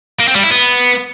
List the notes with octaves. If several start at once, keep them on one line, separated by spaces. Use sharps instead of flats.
A#3
C4
G3
E4
B3